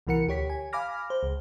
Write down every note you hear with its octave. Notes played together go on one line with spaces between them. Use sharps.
C2 B2 E3 A#4 F#5 C#7
D2 G4 C#5 B6
G#5
F5 G#5 B5 D6 F6 A#6
C5
C#2